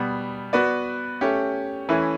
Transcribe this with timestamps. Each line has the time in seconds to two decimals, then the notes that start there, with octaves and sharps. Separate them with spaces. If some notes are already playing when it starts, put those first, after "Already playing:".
Already playing: B2 G3 B3
0.53 B3 F#4 B4 D5
1.21 A3 C#4 G4
1.88 E3 A3 C#4 E4 B4